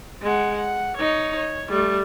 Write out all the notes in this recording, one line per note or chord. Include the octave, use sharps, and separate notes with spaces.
G#3 F#5
F#5
D#4 C#5
C#5
G3 A3